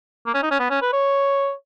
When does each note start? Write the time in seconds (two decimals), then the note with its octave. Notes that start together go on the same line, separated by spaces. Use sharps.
0.26 A#3
0.34 C#4
0.43 D#4
0.51 C#4
0.59 B3
0.70 C#4
0.82 B4
0.93 C#5